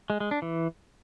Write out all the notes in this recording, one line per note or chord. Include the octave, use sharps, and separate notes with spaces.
G#3
G#3
D4
E3